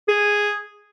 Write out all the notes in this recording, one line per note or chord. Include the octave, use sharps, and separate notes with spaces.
G#4